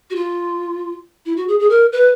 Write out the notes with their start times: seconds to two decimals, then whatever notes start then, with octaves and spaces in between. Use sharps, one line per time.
0.10 F#4
0.16 F4
1.26 E4
1.37 F#4
1.48 G#4
1.60 G#4
1.70 A#4
1.92 B4